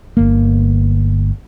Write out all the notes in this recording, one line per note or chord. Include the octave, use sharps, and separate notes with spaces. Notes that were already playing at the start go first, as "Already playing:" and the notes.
G1 A#3